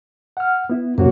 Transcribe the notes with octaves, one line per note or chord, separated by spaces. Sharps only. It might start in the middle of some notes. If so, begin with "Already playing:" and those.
F#5 F6
B3 E4
F#2 C3 A#3 F#4 C#5